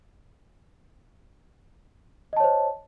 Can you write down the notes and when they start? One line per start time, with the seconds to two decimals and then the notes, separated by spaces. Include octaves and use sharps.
2.33 D#5
2.37 A5
2.40 C#5
2.44 C5